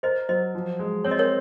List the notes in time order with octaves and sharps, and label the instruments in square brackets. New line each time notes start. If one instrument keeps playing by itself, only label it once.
[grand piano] A#4 [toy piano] C5 D#5
[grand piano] F#3 [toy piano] C5 D#5
[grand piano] F3
G#3
[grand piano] C4 [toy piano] C#5
[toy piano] D#5
A#4 C#5